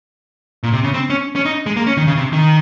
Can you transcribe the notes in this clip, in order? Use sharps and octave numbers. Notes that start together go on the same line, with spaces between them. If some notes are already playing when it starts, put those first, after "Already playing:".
A#2
C3
C#3
C4
C#4
C#4
D#4
G#3
A#3
C#4
D#3
C#3
C3
D#3